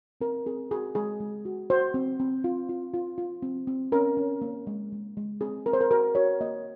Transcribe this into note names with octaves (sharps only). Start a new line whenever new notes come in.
C4 A#4
C4 G#4
F#4 G#4
G#3 G#4
G#3
F#4
F#4 C5
C4
C4
F4
F4
F4
F4
C4
C4
C#4 A#4
C#4
A#3
G#3
G#3
G#3
C4 G#4
C4 A#4
C5
A#4
F#4 A#4
F#4 C#5
A#3 D#5